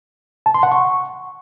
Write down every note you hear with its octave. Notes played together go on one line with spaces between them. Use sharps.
A5
C6
F#5
C#6